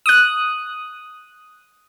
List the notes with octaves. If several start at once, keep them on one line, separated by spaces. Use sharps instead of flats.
D#6 F#6